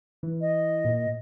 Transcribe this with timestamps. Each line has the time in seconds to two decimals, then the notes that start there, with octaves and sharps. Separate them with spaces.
0.23 E3
0.41 D#5
0.85 A#2